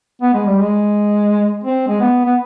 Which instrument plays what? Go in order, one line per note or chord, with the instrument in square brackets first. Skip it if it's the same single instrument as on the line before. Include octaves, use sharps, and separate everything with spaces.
[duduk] B3
G#3
G3
G#3
C4
G#3
B3
B3